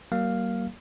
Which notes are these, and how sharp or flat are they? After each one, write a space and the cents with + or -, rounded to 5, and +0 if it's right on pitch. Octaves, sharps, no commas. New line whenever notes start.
F#3 +45 A#3 +0 F5 +0